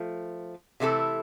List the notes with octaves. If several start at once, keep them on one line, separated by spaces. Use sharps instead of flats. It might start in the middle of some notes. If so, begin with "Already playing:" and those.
Already playing: F3 A3
C3 E3 A3 E4 A4